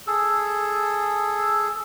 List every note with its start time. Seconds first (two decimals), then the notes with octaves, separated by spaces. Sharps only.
0.07 G#4 A4